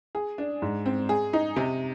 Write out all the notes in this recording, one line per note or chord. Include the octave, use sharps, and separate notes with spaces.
G#4
D4
G#2
C4
G#4
D#4
C3